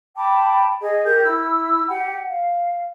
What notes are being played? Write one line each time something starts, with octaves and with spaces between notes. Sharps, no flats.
G5 A5 B5 D6
G#4 D#5
G4 A#4 G6
E4 E6
G4 F#5 G5
F5